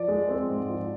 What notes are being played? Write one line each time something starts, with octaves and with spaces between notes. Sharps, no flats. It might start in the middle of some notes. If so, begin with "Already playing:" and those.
Already playing: F3 D5
G#3
C4
G#2
F3